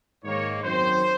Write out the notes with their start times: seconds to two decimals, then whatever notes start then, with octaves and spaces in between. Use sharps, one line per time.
0.23 G#2 D#3 A#3 C#5
0.63 F#2 D#3 F#3 C4 C5